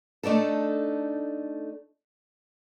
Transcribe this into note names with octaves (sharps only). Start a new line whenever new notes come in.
A3 D4 D#4 A4